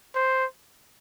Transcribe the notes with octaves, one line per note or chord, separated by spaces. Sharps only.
C5